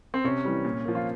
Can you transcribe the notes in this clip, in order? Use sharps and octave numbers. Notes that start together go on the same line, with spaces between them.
C4
C3 C#4
E3 G3
A#2
F3 A#3
F4